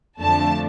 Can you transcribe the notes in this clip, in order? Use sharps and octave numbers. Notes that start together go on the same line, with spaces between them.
F2 D3 F3 A3 D4 A5